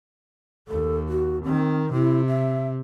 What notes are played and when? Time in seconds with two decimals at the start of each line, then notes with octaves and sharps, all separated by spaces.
0.68 D#2 A4
1.09 F#4
1.44 D#3 C4
1.92 C3 E4
2.27 E5